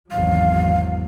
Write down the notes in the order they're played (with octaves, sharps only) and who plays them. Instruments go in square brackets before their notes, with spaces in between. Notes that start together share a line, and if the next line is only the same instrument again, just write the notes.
[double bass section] G#1 E2 F#3 [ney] F5